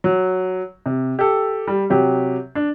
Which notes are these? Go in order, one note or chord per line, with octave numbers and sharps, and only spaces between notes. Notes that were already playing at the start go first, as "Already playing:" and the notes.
F#3
C3
G4 A4
G3
C3 F#3 G4
D4